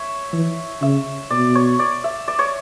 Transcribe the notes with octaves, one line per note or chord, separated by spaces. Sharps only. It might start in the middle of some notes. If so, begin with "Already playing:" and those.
Already playing: C#5 E5
E3
C#3 E5
B2 D5
C#5
D5
E5
D5
C#5